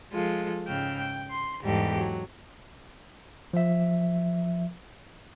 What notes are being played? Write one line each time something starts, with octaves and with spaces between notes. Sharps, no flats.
F3 G#3 F4 A4
G#2 C#3 G5 E6 F6
G5
C6
E2 G#2 G3 G4 A4
F#3
F3 E5